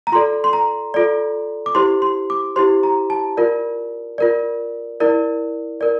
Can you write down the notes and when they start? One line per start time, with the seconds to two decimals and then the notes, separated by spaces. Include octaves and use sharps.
0.07 A#5
0.12 F4 A4 D5 C6
0.44 C6
0.53 A#5
0.94 F4 A4 D5
1.66 D6
1.75 E4 G4 C5 C6
2.02 C6
2.30 D6
2.56 E4 G4 C5 C6
2.83 A#5
3.10 A5
3.37 F4 A#4 D5
4.18 F4 A#4 D5
5.00 E4 A#4 D5
5.81 A#4 D5